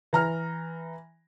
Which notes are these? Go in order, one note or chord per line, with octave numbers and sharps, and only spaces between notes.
E3 A#5 F6